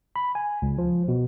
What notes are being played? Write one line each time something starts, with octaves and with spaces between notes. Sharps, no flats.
B5
G#5
C#2
F3
B2